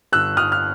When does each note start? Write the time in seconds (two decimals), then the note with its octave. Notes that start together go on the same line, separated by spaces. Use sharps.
0.12 G1 E6 F#6
0.37 G1 D#6 F6
0.52 F6